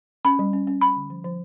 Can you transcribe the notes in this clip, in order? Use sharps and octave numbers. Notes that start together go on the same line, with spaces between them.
C#4 B5
G3
C#4
C#4
C#4 B5
D3
F3
F3